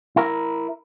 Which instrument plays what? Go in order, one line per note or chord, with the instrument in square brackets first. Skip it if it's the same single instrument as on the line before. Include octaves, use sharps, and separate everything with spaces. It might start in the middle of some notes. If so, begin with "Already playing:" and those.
[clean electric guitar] E4 A#4